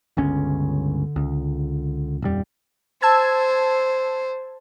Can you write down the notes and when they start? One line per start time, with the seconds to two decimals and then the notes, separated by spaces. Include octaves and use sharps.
0.17 G1 C#2 D3 C#4
1.16 C#2
2.22 D#1 F2 G3
3.02 C5 A5 E6 G#6